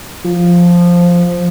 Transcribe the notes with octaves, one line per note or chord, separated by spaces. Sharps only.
F3